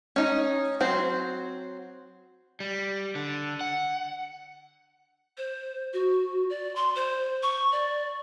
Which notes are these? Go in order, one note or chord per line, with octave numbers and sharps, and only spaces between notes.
C#4 D#4 D#5
F#3 C4 C5
G3
D3
F#5
C5
F#4
D5
C6
C5
C#6
D5